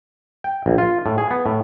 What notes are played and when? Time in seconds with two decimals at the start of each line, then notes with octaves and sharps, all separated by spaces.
0.44 G5
0.66 A#1
0.78 F4
1.06 A2
1.18 G#4
1.31 B3
1.46 A2